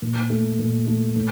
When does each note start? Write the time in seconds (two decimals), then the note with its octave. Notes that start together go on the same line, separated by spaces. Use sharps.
0.02 A#2
0.30 A3
0.59 A#2
0.87 A3
1.16 A2